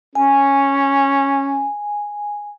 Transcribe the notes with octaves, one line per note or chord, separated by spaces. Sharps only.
C#4 G#5